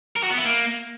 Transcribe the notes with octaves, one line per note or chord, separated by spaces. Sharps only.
A#4
F#4
B3
E4
A#3